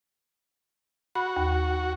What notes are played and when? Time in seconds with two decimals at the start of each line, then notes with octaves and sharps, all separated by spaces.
1.15 F#4 B5
1.36 D#2